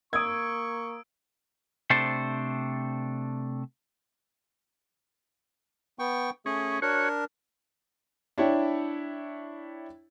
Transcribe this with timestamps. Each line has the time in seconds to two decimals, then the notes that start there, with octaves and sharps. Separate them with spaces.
0.13 A#3 C#6 D#6 E6 G#6 D7
1.90 C3 A3 D4 A4 C5
5.99 B3 G5 C#6
6.46 A3 C#4 G#4
6.82 D4 F#4 A#4 C#5
8.38 D4 E4 C#5 G5